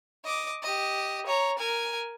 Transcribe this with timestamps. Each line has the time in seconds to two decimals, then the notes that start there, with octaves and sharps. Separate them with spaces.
0.25 D#5 D6
0.63 G4 D#5
1.26 C#5 A#5
1.58 A#4 G#5